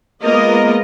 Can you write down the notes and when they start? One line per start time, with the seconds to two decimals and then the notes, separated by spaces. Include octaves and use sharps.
0.22 G#3 A#3 B3 F4 A#4 D#5